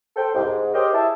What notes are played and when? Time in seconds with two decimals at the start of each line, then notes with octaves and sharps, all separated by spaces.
0.17 A4 C5 G5
0.34 C2 G#2
0.46 G#2
0.74 G4 A#4 C5 C#5 D#5 G5
0.94 E4 G#4 E5 A5